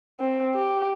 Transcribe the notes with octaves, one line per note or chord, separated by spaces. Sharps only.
C4
G4